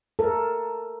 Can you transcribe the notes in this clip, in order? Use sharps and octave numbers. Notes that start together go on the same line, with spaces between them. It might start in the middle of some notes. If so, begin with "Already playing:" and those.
A4 A#4